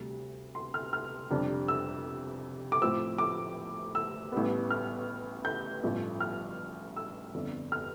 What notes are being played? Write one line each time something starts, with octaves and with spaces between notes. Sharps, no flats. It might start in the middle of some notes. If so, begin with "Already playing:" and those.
Already playing: D2 C3 G3
C6
F6
F6
F2 C3 G3 D4
E6
D6
A2 F3 C4 E6
D6
E6
A1 A2 G3 B3
F6
G6
A1 G2 F3 A3
F6
E6
G1 F2 D3
F6